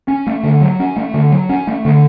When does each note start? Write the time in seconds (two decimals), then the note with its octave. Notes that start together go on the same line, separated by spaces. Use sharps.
0.08 C#4
0.27 A3
0.43 D3
0.61 F#3
0.80 C#4
0.96 A3
1.14 D3
1.32 F#3
1.49 C#4
1.67 A3
1.85 D3